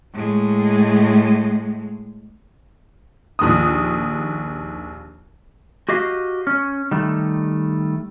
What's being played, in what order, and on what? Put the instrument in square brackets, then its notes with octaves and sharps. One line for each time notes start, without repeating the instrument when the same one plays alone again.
[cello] A2 G#3
[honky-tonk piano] A#1 D#2 D#6
[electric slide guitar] F#4 G4 D#5 F5
C#4
D#3 G3 A3